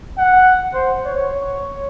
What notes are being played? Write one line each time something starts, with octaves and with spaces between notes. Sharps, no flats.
F#5
C5
C#5